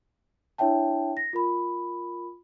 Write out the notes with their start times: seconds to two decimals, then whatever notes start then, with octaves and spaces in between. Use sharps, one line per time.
0.58 D4 E4 C#5 E5 G5 A5
1.17 A#6
1.33 F4 A#4 B5